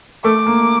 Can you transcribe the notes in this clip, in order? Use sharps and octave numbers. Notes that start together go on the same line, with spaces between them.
A3 D6
A#3